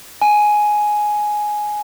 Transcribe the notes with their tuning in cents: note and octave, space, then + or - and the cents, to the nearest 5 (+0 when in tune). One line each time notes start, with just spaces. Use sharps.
G#5 +10